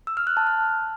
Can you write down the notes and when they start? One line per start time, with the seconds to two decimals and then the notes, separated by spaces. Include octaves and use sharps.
0.07 E6
0.17 F6
0.27 F#6
0.37 A5
0.47 F6